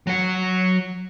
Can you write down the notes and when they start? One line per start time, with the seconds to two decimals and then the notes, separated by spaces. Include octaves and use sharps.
0.07 F#3 F#5